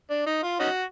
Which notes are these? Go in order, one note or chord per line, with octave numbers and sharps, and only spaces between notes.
D4
D#4
F4
C#4 D#4 F#4